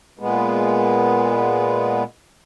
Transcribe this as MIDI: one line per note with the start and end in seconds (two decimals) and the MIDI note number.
0.19 2.03 46
0.19 2.03 56
0.19 2.03 59